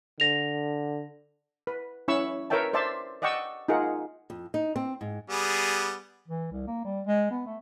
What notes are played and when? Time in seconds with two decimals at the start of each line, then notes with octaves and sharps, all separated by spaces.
0.20 D3 A#6 F7
1.67 B4
2.08 C#4 E4 C#5 B5 C#6 E6
2.50 A#4 B4 C#5 E5 G5 A5
2.73 C5 D5 E5 A5 C6
3.22 D5 D#5 F#5 G5 C#6 E6
3.68 D#4 F4 G#4 A#4 F#5
4.30 F2
4.54 D#4
4.76 C4
5.01 G#2
5.29 G3 B3 G#4
6.28 E3
6.52 C2
6.67 A#3
6.85 G3
7.06 G#3
7.31 B3
7.46 A3